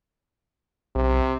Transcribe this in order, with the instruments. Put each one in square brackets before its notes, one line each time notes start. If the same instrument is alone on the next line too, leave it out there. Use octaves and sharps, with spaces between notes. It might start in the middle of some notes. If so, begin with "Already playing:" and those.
[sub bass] B1 [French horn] C3